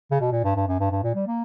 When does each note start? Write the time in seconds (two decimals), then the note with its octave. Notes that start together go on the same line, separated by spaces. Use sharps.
0.12 C#3
0.20 B2
0.32 A#2
0.44 G2
0.56 G2
0.68 F#2
0.80 G2
0.91 G2
1.03 A#2
1.15 G3
1.27 A#3